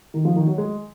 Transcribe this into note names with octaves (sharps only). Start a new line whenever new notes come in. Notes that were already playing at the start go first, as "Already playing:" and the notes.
D#3
F3
D#3
F#3
G#3